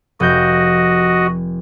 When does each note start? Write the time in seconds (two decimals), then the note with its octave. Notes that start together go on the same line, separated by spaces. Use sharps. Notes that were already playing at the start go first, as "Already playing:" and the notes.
0.20 F1 F#4 D#5 G6